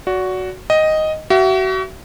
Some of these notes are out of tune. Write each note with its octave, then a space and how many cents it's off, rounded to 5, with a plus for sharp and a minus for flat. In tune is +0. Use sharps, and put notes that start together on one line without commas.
F#4 +0 D5 -35
D#5 +0 G5 +0
F#4 +35 E5 +25